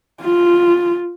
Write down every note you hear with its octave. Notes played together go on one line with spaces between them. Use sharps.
F4